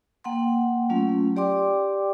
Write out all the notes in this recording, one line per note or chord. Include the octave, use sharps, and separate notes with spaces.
A#3 F#5 G5 C6
F#3 A3 C#4 F4
G4 D5 G5 C6 D6